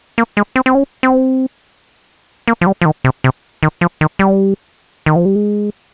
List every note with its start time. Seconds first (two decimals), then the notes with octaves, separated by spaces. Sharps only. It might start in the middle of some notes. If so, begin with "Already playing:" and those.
0.18 A#3
0.37 G#3
0.56 C4
0.66 C4
0.75 C#4
1.03 C4
2.48 A#3
2.61 F3
2.67 G3
2.82 F3
2.86 D#3
3.04 C3
3.24 C3
3.63 D#3
3.81 F3
4.01 D#3
4.19 G3
5.06 D#3
5.16 F3
5.25 G3
5.35 G#3